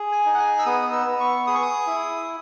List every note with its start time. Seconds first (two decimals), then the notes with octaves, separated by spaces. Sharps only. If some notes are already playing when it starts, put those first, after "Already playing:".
Already playing: G#4
0.12 G#5
0.26 D#4
0.34 F#5
0.39 G#5
0.59 E6
0.66 B3 D#6
0.82 D#6
0.93 E6
1.06 B3
1.20 C#6
1.47 G#4 D#6
1.55 C#6
1.62 D#6
1.87 E4